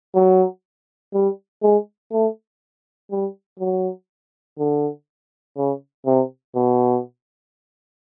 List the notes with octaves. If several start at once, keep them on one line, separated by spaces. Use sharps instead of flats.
F#3
G3
G#3
A3
G3
F#3
D3
C#3
C3
B2